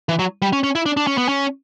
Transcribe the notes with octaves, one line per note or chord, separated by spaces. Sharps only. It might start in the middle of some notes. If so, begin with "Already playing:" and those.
E3
F#3
G3
C#4
C#4
E4
D4
D4
C#4
B3
C#4